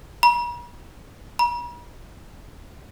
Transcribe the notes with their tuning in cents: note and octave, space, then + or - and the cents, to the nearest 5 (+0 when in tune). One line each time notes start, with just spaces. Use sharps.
B5 -45
B5 -45